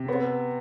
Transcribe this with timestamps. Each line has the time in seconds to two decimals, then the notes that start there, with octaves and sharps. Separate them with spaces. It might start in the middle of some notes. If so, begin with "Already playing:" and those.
Already playing: C3
0.08 B3